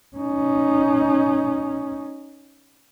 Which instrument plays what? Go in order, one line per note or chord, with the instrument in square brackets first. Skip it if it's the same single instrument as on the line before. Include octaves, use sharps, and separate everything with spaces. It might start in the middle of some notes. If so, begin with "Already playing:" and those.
[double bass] C#4 D#4